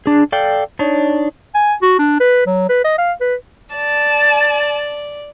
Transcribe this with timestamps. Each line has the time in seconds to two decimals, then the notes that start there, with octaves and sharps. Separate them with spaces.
0.06 D4 G#4
0.32 A4 D5 F5 G5
0.79 D4 D#4 C#5
1.55 G#5
1.82 F#4
1.99 D4
2.20 B4
2.46 F#3
2.69 B4
2.85 D#5
2.98 F5
3.21 B4
3.75 D5 A5